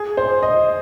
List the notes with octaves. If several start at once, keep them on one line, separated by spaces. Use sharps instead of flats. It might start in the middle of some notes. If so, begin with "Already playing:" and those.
Already playing: G#4
C5
D#5